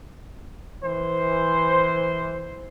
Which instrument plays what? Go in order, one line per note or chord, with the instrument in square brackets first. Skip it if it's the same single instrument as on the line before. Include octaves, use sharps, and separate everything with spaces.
[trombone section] E3 C5